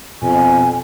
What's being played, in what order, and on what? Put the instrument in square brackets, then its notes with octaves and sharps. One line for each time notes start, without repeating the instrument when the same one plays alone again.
[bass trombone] F2 [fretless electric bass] B2 [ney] G#5